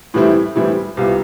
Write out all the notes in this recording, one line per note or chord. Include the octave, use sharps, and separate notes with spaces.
A2 E3 G3 C4 E4
A2 E3 G3 C4 E4
C2 C3 G3 B3 F4